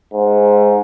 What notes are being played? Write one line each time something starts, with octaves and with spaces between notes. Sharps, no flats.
G#2